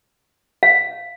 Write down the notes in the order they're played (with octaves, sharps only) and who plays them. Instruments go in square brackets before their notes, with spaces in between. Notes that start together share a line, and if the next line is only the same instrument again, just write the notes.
[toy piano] F5